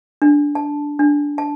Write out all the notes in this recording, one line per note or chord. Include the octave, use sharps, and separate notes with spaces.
D4
A5
D4
A5